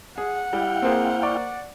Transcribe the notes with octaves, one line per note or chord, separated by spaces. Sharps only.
G#4 F#5
G3 E4 F5 G5
A#3 C4 G#4 A#4 C5
D5 C#6 D6